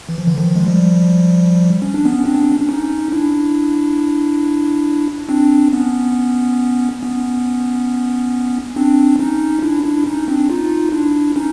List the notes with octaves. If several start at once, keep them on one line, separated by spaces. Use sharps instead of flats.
E3
F3
D3 E3
D#3 F3
G#3
F3 G3
C#4
D4
B3 C#4
C4 D4
B3
C4
C#4
D4
C#4 D#4
D4 E4
C4 D4
B3 C#4
B3 C#4
C4 D4
C#4 D#4
D4 E4
D4 E4
C#4 D#4
C4 D4
D#4 F4
D4 E4
C#4 D#4